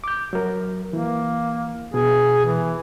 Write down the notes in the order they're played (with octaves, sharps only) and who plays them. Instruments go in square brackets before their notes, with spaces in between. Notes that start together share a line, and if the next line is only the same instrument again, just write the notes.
[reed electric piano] D6 G6
F#3 A#4
[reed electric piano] E3 [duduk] A#3
[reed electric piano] B2 [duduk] G#4
[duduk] E3